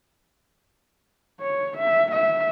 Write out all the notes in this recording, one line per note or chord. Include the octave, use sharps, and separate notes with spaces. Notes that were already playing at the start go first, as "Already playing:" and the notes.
C#5
E5
E5